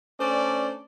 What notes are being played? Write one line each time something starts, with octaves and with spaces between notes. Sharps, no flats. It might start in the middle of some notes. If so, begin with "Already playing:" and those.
A3 C#4 D4 C5 D5